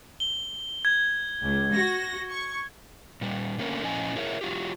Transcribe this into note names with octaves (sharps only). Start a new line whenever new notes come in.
G7
G#6
C#2
F#4 A#6
C#6
A#2 G3
D3 A3 A#3 C#4 A#4
A#2 F3 C#4 E4 D#5 G#5
E4 G#4 A#4 C#5 E5
F#3 F4 G4